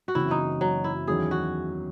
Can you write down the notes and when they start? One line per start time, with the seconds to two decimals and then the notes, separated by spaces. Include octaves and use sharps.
0.08 F#4
0.15 F#1 F#2 C#3 E3 C4 E4
0.31 D#4
0.61 F#3
0.84 E4
1.07 E2 D#3 F#3 C#4 G#4
1.31 F#4